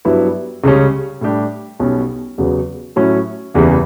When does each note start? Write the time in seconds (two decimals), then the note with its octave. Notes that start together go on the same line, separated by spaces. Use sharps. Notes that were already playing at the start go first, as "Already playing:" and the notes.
0.05 G2 F#3 B3 E4
0.64 C#2 C#3 G3 C#4
1.21 A2 G3 D4 G4
1.80 B1 B2 G3 C#4
2.38 E2 C#3 F#3 B3
2.96 A2 F#3 C#4 E4
3.54 F#1 E2 C#3 E3 G3